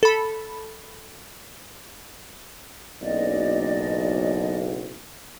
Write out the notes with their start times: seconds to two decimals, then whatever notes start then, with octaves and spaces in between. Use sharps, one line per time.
0.03 A4 B5
3.02 F#1 B1 D5 D#5